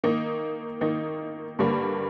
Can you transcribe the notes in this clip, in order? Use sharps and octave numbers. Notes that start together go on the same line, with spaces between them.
D#3 A#3 D#4
D#3 A#3 D#4
G2 D3 G3 A#3